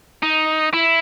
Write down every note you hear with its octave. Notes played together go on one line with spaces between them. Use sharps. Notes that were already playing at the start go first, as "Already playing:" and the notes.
D#4
E4